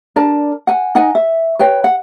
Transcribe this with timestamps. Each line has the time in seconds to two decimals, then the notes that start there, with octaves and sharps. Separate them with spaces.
0.16 D4 A#4 D5 A5
0.67 F#5 G#5
0.95 D#4 D#5 F#5 G#5
1.15 E5
1.59 B4 C#5 G5
1.84 F#5